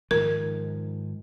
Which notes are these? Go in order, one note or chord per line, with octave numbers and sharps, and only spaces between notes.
G#2 D#3 F3 A#4